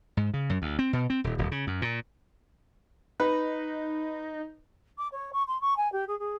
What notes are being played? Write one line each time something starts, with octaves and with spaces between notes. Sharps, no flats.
G#2
C#3
F#2
D2
C4
B2
C4
D#1
D1
C#3
F#2
A#2
D#4 B4
D6
C#5
C#6
C6
C#6
G#5
G4
G#4
G#4